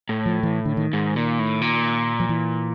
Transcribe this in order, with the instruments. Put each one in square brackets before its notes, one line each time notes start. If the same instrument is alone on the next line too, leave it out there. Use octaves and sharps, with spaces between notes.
[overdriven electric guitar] A2
[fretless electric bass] F3
E3
D3
D#3
[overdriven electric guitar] G#2
A#2
A2
A#2
[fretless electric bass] F3
E3